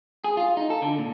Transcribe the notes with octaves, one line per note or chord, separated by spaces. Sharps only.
G#4
F4
D#4
A4
D3
A#2